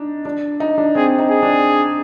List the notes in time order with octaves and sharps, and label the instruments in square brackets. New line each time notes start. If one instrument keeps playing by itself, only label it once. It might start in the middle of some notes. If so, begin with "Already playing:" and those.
Already playing: [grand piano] D4 D#4
D4
D#4
D4
[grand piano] C4 [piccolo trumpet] G#4
[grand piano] D#4
[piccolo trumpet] G#4
[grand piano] D4